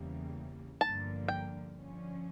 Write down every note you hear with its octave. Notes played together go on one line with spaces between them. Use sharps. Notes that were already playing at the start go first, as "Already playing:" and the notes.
Already playing: E2 C#3 E3 G3 A#3
G1 G2 D3 F3 A#3 A5
G5
D3 F3 C#4